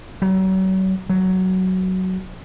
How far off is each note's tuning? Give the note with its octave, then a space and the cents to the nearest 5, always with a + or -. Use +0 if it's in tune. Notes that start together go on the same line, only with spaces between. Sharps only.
F#3 +40
F#3 +10